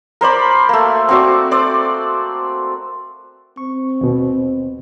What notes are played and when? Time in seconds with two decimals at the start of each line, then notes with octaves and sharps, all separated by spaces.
0.21 A#4 C5 D5 B5
0.69 A3 A#3
1.09 C4 F#4 D5
1.51 C5 D5
3.57 C4 C#6
4.01 D#2 B2